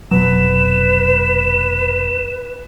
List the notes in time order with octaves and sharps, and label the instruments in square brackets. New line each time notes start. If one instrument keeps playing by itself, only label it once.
[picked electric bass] F1 B2 F#3 [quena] B4 [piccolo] E7